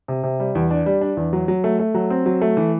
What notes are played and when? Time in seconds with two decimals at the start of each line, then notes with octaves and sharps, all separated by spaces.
0.08 C3
0.24 C3
0.40 G3
0.55 E2
0.71 D4
0.86 G3
1.01 D4
1.17 E2
1.33 F#3
1.48 F#3
1.64 A3
1.79 A3
1.94 F#3
2.10 C4
2.26 F#3
2.41 A3
2.57 E3